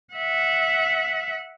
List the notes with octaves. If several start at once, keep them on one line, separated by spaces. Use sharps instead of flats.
E5 F#5